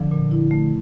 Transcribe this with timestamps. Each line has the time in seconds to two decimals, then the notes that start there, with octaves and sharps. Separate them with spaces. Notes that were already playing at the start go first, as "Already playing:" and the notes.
Already playing: D3 F3
0.11 A#2
0.31 E4
0.51 A3